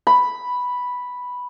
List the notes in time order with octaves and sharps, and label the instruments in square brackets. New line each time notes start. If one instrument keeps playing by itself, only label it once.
[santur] B5